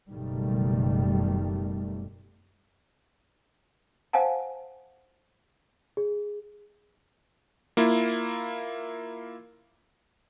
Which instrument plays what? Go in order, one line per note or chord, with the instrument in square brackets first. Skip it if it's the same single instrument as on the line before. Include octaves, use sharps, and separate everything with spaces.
[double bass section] F#1 B2 D#3 G3 A3
[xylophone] C5 F5 F#5 G#5 A5
[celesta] G#4
[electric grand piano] A#3 E4 F4